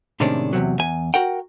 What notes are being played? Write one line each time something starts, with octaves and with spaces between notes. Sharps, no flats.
A2 C3 D#3 G#3 C#4 D4
E2 G#2 C3 F#3
E2 G#5
F#4 A#4 F#5 G5